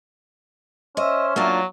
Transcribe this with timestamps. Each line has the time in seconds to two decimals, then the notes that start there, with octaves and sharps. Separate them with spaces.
0.97 C#4 C5 D#5 E5
1.36 F#3 A#3 D4 F4